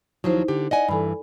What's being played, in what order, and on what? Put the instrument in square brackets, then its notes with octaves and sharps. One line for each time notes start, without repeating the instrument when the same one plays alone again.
[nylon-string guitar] D#2 F3 F#3 [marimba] D#4 E4 C5
[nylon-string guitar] D3 G4
[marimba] D5 [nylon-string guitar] D#5 F#5 G#5
[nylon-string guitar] G2 E3 [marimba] A4 G#5 B5